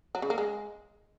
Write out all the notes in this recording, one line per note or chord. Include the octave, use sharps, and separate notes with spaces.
F#3
C#3
A#3
G#3